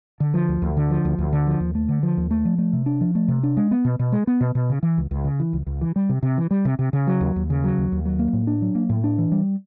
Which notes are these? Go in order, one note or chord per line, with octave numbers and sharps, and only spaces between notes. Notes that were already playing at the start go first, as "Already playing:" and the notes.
D3
F3
D2
D2
D3
F3
D2
D2
D3
F3
D#2
A3
D3
F3
D#2
A3
F3
A3
C3
D4
F3
A3
C3
D4
G#3
B3
B2
B2
G#3
B3
B2
B2
C#3
E3
C#2
C#2
C#3
E3
C#2
C#2
E3
G3
C3
C3
E3
G3
C3
C3
C#3
F#3
D#2
D#2
C#3
F#3
D#2
D#2
F#3
A#3
A2
D4
F#3
A#3
A2
D4
E3
G3